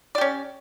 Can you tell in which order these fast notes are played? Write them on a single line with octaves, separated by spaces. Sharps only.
D5 G4 C#4